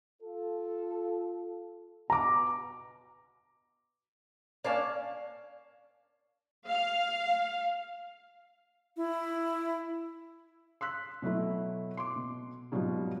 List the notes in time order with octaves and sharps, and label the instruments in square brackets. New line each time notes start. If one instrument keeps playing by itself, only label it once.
[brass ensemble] F4 A4
[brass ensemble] B2 [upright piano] A#5 D6
[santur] A#3 C#4 D4 [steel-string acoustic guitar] D5 F5 A5
[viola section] F5
[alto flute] E4
[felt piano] C6 E6 F#6 B6
B2 F#3 A3 E4
C6 D6
B2
G#2 B2 F#3 G3 F4